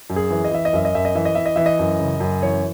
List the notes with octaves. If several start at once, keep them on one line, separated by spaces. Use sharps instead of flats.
F#2
G#4
E3
D#5
E3 E5
D#5
F#2 E5
D#5
F#2 E5
D#5
E3 E5
D#5
E3 E5
D#5
E3 E5
D#5
F#2
C#3
F#2
E3 C#5